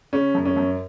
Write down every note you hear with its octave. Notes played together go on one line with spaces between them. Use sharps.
C#3 C#4
F#2
C#4
F#2